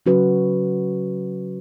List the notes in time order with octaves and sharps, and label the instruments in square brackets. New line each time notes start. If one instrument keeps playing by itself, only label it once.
[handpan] C#3 F#3 C#4 F#4 B4